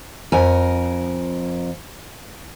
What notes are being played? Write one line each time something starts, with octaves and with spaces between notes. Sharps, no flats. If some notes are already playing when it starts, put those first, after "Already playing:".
F2 A#4 G#5